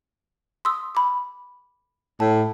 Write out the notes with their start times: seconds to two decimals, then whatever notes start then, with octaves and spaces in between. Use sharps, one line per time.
0.65 C6 D#6 E6
0.95 B5 D6
2.20 A2 A5